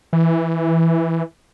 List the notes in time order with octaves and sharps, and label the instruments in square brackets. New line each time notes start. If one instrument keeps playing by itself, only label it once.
[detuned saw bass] E3